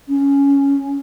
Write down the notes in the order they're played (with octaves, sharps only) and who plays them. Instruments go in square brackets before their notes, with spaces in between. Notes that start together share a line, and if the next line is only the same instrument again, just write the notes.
[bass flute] C#4